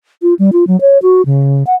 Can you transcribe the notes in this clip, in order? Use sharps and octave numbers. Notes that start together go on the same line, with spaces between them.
F4
G3
F4
F#3
C#5
F#4
C#3
F#5